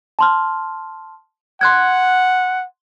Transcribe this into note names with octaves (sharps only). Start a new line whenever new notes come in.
A5 C6 F6
F#5 C6 F#6 G#6